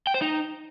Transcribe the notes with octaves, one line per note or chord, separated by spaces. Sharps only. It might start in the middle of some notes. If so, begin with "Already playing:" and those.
G5
C5
D#4